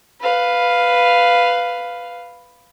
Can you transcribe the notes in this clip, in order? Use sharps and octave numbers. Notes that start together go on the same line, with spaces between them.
B4 F5